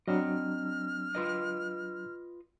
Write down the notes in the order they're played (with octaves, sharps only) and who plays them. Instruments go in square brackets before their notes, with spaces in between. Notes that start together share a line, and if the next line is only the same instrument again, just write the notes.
[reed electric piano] F#3 D4 [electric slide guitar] C4 D#5 [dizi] F6
[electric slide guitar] F4 B4 D#5